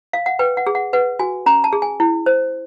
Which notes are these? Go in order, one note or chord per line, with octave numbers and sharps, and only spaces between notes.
F5
F#5
B4 G5
F#5
G#4
F#5
B4 F#5
F#4 G#5
C#4 A#5
A5
G#4
G#5
E4
C5